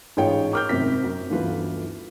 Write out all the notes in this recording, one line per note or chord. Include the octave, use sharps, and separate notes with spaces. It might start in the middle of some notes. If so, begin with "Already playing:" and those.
A1 G#2 F4 G#4 C#5 G5
D6 F6 G6
G#1 F#2 C3 C4 B6
F#2
G1 D2 E3 F4 B4